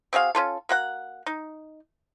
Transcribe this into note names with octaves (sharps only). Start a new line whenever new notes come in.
C4 F#4 G#4 F5
C#4 F4 A4
A#3 F#4 F#5
D#4